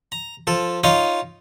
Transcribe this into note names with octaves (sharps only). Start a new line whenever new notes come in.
A#5
F3 A4
D#4 F4 C#5 D#5 F5